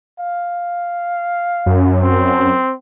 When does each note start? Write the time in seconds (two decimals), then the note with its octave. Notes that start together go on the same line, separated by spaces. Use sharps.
0.19 F5
1.66 F#2
2.00 C4